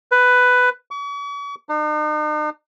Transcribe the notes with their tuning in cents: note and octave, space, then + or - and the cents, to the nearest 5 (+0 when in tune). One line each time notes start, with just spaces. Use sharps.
B4 +10
C#6 +45
D#4 -45